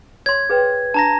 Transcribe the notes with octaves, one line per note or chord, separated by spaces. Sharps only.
C#5 C6 G#6
G#4 B4 G5
D4 A5 A#5 A#6